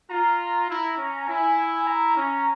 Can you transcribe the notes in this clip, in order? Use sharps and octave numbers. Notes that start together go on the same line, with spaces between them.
F4 A#5
E4
C#4
E4 G#5
A#5
C#4